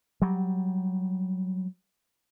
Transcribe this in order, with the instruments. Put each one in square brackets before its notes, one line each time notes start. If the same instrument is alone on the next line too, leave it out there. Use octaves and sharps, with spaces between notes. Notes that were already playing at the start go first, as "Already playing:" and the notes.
[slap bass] F#3 G3